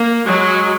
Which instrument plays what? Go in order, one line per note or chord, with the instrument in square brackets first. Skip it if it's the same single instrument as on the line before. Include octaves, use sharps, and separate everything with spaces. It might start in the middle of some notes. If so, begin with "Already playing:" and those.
Already playing: [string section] A#3
F#3 G#3